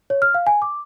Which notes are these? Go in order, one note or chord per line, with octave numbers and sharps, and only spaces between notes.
C#5
F6
F5
G#5
D6